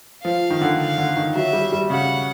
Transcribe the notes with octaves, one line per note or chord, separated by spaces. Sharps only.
F3 F5
D#3
D3
F5
D3
D#3
F#3 E5
G3
G3
C#3 F#5